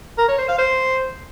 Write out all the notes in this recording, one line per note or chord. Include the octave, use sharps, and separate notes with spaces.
A#4
C#5
C5
F5
C5